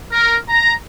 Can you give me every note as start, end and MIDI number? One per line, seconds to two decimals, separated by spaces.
0.11 0.37 70
0.48 0.72 82